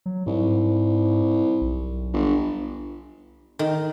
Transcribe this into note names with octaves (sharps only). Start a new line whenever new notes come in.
F#3
C2 G#2
B1
G1
D#3